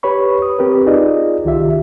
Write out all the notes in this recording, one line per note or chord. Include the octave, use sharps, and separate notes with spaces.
G4 B4 C#5 B5 C#6
D#6
C4 G4 A#4 B4
D#4 F4 G#4 D5 D#5
C2 D#3 F4 G4 E5